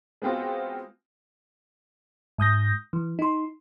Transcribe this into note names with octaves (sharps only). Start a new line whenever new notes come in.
G#3 B3 C4 F4 F#4
G#2 D#6 G6 A#6
E3
D#4 C6